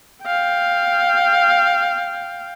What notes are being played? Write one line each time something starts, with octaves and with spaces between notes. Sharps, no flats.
F5 G5